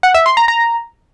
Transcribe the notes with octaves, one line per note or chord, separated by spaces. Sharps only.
F#5
E5
C6
A#5
A#5